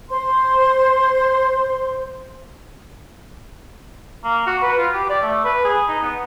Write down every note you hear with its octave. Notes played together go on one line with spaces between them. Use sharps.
C5 C6
A#3
F#4
B4
F4
G4
D5
A3
B4
G#4
D#4
B3